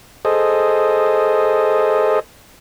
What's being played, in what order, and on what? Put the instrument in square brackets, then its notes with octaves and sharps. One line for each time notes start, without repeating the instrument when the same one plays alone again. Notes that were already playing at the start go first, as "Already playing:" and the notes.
[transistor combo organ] G#4 A4 C5 D#5